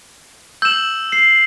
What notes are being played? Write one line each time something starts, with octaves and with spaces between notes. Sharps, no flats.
E6 G6 E7 F#7
C7